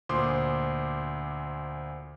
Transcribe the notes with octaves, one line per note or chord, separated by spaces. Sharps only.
D2 A#2 C5 C6 D6 D#6